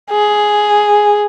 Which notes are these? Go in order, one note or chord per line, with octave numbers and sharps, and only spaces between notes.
G#4